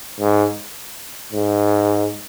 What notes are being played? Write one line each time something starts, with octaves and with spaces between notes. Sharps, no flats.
G#2
G#2